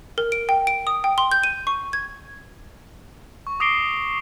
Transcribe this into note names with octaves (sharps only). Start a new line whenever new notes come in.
A#4
D7
G5
D7
D#6
G5
C6
G6
D#7
C#6
G#6
C#6
D6 D#6 A#6 C7 D7 G7